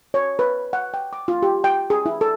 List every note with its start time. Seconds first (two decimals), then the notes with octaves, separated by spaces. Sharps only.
0.14 C#5
0.39 B4
0.73 F#5
0.94 G5
1.13 D6
1.28 F4
1.43 G4
1.64 G5
1.90 G#4
2.06 E4
2.21 A4